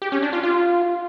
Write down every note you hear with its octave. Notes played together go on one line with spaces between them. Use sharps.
G4
C#4
D4
F4
F4